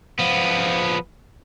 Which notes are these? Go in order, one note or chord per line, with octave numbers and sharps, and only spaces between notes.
F3 B3